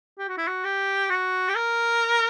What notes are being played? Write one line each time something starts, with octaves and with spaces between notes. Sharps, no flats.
G4
F#4
E4
F#4
G4
F#4
G4
A#4